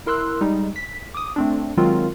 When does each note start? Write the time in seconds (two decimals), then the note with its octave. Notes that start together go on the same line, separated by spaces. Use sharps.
0.06 E4 A#4 C6 E6 F#6
0.41 G3 G#3 D#4
0.76 B6
1.14 D6 D#6
1.36 A3 C4 D4
1.77 D#3 F#3 G#3 C4 F4 A#4